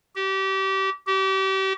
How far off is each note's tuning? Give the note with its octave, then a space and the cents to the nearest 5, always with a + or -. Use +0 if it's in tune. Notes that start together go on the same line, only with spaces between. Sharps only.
G4 -30
G4 -35